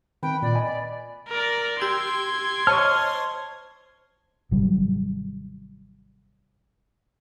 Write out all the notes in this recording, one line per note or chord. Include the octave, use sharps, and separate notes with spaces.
D#3 C4 B4 G5
A#2 D5
D#5 G#5 B5
D5
A#4 D5
G4 C6 E6 G#6 D7
C5 C#5 D#5 A5 C#6 F6
G#1 C3 F#3 G3